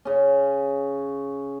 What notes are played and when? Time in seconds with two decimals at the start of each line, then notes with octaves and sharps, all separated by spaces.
0.05 C#3 C#4